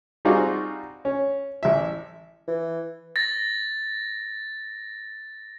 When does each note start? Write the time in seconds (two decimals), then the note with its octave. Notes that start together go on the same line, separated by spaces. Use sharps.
0.25 G3 C4 D#4 F4 F#4 G#4
1.05 C#4
1.63 A1 E5
2.48 E3
3.16 A6 A#6